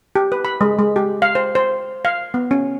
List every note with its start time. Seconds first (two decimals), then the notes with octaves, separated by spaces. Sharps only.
0.15 G4
0.32 B4
0.45 B5
0.61 G#3
0.79 G#3
0.96 G4
1.22 F5
1.35 C5
1.55 C5
2.05 F5
2.34 B3
2.51 C#4